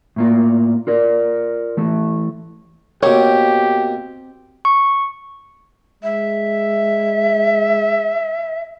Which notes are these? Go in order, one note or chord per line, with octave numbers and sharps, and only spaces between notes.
A2 A#3 F4
F4 A#4 D5
E3 A3
B2 A#3 C4 G4 C#5
C#6
G#3 E5